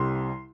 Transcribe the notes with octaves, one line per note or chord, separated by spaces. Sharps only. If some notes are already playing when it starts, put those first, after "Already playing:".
Already playing: C2 C3 G3 C6